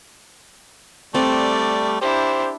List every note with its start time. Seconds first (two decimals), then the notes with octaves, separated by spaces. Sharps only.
1.15 G3 A3 C4 D5
2.01 D4 E4 G4 C5